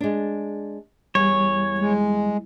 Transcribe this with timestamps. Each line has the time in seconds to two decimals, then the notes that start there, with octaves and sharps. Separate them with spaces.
0.01 G#3 D4
1.15 E2 G3 C#5
1.78 G#3